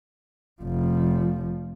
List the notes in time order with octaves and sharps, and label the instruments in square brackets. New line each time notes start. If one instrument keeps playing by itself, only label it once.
[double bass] F1 F3